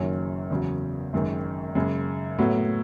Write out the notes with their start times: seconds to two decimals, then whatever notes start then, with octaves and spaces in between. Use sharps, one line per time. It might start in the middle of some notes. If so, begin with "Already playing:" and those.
Already playing: F#1 F#2 D#3 F#3 C#4
0.50 E2 C#3 F#3
1.13 G#1 F#2 D#3 G#3
1.75 F#2 C#3 G#3
2.39 A2 F#3 B3